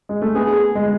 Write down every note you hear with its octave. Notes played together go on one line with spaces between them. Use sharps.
G#3
A3
B3 G#4
G#3